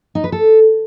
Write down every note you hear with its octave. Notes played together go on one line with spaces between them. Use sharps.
D#4
B4
A4